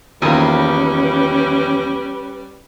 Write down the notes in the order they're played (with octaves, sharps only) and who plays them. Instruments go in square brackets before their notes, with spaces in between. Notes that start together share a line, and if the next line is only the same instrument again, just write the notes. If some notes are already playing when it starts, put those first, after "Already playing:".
[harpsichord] A#1 D#3 D#6 [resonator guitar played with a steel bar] E2 A#3 [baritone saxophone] G3 [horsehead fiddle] C#4 B4